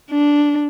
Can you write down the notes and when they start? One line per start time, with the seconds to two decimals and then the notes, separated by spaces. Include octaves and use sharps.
0.11 D4